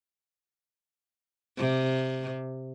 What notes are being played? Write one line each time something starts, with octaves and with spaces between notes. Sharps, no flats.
C3